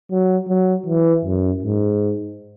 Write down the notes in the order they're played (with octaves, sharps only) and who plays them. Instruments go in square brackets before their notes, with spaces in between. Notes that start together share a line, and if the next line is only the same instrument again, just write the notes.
[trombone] F#3
F#3
E3
F#2
G#2